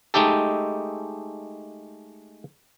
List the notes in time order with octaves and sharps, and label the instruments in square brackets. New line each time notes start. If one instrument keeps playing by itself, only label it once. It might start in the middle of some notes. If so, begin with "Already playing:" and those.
[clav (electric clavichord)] G#3 A3 D#4 G4 A4